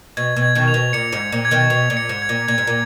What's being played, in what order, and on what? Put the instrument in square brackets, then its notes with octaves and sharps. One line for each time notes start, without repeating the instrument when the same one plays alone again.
[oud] B2 [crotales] G#6
[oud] B2
[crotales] G#6
[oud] B2 D#3
[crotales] F7
[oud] B2
[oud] A#2 [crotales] C#7
[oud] G#2
[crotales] G#6
[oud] A#2
[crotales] G#6
[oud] B2 D#3
[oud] B2 [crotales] F7
[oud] A#2
[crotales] C#7
[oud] G#2
[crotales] G#6
[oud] A#2
[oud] A#2 [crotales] G#6
[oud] G#2
A#2